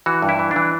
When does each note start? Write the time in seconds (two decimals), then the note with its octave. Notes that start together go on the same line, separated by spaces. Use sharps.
0.06 E3 F#4
0.23 G2
0.29 E4
0.39 E3
0.51 D4
0.56 E3